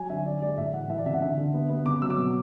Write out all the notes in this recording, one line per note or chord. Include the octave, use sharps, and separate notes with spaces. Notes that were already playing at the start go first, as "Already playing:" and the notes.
Already playing: F#3 G#5
D3 E5
D3 D5
G#3 D5
A2 E5
E3 F#5
E3 E5
D5
C#3 E5
F#5
D3 E5
D3
B3
B3
C#3 D6
F#3 E6
D6
B2